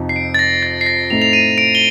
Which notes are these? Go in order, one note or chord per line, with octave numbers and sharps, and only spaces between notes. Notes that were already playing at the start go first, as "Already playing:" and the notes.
Already playing: F2 C3 F3 C4 D#4
C7
D7
A6
A#6
A6
C7
A#6
A2 A3 C4 D#4 F7
F7
D#7
D7
G7